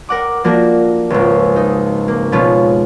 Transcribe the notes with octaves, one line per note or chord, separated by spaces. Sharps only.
A#4 F#5 D6
F3 A#3 D4 F#4 A#4
G#1 C#2
D#4
A#3
B2 F3 G#3 B3 C#4 F4